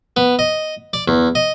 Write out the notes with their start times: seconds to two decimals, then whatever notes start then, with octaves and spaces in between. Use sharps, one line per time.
0.17 B3
0.39 D#5
0.93 D5
1.08 E2
1.35 D#5